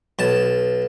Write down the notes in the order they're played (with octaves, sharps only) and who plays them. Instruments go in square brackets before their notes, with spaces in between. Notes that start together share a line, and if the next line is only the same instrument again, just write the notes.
[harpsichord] B1 A5